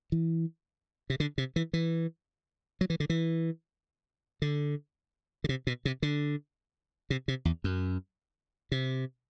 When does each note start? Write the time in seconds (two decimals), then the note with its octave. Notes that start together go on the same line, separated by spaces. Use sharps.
0.12 E3
1.10 C3
1.20 D3
1.38 C3
1.56 E3
1.73 E3
2.81 F#3
2.90 E3
3.00 D3
3.10 E3
4.42 D3
5.44 D3
5.49 C3
5.67 B2
5.85 C3
6.02 D3
7.10 C3
7.28 C3
7.45 E2
7.64 F#2
8.72 C3